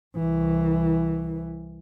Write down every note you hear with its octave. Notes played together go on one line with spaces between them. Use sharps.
C2 E3